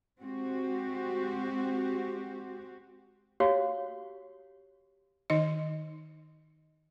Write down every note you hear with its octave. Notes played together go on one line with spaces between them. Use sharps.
G#3 C4 F#4 G4
F#4 G4 C#5 F5
D#3 D#4 D#5